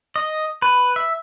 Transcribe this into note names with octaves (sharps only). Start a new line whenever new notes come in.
D#5
B4
E5